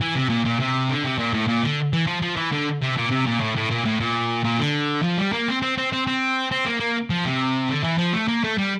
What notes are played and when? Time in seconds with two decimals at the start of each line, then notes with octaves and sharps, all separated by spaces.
0.01 E3
0.15 C3
0.29 A#2
0.45 A#2
0.60 C3
0.89 D3
1.03 C3
1.18 A#2
1.34 A2
1.48 A#2
1.63 D3
1.93 E3
2.07 F3
2.22 F3
2.36 E3
2.52 D3
2.81 C3
2.97 A#2
3.10 C3
3.26 A#2
3.40 A2
3.56 A2
3.70 A#2
3.85 A2
4.00 A#2
4.44 A#2
4.59 D3
5.03 F3
5.18 G3
5.33 A#3
5.48 C4
5.62 C4
5.78 C4
5.92 C4
6.07 C4
6.52 C4
6.66 A#3
6.80 A#3
7.10 F3
7.25 C3
7.69 D3
7.84 E3
7.98 F3
8.13 A3
8.28 A#3
8.44 A3
8.58 G3